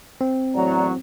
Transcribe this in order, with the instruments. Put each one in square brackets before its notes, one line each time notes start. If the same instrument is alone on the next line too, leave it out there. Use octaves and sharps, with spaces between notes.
[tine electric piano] C4
[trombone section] E2 A2 F#3 [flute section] D5 F#5 A#5